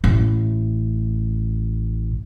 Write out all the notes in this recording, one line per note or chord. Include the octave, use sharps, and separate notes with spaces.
A1 A2